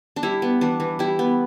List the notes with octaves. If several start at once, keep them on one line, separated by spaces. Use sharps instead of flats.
D4
G3 E4
B3
E3 D4
E3
G3 E4
B3